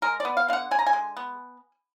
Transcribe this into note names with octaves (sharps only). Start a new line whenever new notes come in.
G#3 A#4
D5
B3
F5
D3 F5 F#5
D3 G#5
A#5
G#5
G#3
B3